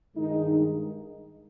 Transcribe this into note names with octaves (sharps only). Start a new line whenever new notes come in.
G2 D#3 G#3 D#4